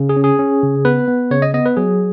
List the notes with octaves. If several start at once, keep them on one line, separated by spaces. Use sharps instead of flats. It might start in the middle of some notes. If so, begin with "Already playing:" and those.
Already playing: C#3
G#4
C#4
G#4
C#4
C#3
B3 B4
B3
C#3 C#5
D#5
B3 D#5
B4
F#3 G#4